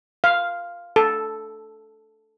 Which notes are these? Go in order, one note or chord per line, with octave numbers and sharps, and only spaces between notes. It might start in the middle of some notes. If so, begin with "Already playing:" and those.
F5
A4